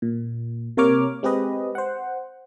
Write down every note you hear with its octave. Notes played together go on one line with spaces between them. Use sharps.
A#2
C3 A#3 A#4 C#5 D6 F6
G#3 C4 G4 G#4 B4 D#5
C5 F#5